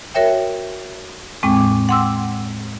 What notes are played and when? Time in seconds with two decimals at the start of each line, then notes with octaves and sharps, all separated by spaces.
0.14 F#4 A#4 C#5 E5 G5
1.43 E2 A2 G#3 C4 G5 D6
1.57 D6
1.89 F#5 G5 C6 D6 E6